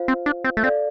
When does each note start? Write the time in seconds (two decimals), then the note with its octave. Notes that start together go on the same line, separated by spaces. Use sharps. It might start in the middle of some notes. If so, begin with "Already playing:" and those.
Already playing: F4 C5 F5
0.08 C4
0.26 D4
0.44 C4
0.57 A3
0.63 C4 A4 D5 F5